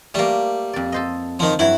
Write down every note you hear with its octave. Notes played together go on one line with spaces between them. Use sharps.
G3 A3 A#3
F2 D5
A4 C5 D#5
D#3 F3
G2 F#3 E4